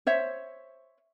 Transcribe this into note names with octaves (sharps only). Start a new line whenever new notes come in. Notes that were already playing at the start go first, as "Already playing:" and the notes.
C5 C#5 E5